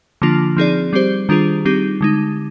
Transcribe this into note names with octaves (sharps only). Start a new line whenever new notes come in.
D3 F3 A#3 D4 F4
F3 C4 D#4 G#4 D5
G3 C4 G4 C5
D#3 G3 D4 F4 G#4
G3 C4 D#4 G4
D3 G#3 D#4